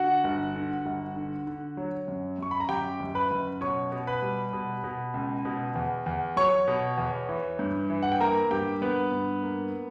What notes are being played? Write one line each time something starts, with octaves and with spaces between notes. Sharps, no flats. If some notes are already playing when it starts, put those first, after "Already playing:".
Already playing: D3 F#4 F#5
G1
D3
G1
D3
D3
F#3
F#2
F#2 C#6
B5
A#5
F#2 G4 G5
F#1
B4 B5
F#1
B2 C#5 C#6
B2
B4 B5
G3
B2
B2
C#2
B2
E2
E2
F#3 C#5 C#6
B2
E2
E3
G2
E3
F#5
G5
A#3 A#4 A#5
G2 G4 G5
G2 B3 B4
G2
A#3